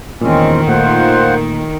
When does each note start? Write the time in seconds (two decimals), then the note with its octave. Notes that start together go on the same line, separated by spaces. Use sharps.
0.21 E2 A#2 D#3 G#3 C4 C#4
0.68 A#2 A3 F4 C5 F#5